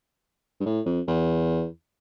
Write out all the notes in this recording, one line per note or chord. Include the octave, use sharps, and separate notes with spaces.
G2
A2
F2
E2